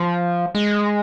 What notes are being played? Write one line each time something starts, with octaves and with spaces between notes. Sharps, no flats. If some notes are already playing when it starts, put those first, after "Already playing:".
Already playing: F3
G#3